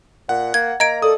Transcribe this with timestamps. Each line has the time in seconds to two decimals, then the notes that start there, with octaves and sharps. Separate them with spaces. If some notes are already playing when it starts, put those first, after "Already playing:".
0.29 A#2 F#5
0.54 A#3 G#6
0.80 A#3 D#5 A#5 G#6 D7
1.02 A4 D5 D#6